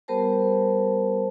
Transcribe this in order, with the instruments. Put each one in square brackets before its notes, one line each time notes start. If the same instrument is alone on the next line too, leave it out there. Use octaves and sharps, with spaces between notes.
[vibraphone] G3 B3 G4 A#4 C5 A5